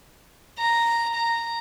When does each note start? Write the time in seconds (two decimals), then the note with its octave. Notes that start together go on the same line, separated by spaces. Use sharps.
0.58 A#5
1.14 A#5